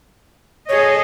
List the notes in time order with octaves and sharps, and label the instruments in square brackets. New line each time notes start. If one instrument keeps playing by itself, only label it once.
[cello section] G#4 A4 D#5 [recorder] C#5